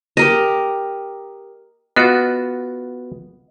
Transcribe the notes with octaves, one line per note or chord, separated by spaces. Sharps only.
G4 A#4 D#5
B3 F4 F#4 D#5 F#5